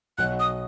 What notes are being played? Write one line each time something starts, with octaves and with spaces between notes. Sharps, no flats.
B1 B2 F#3 F#6
D#6